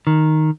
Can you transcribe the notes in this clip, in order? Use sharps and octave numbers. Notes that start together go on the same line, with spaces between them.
D#3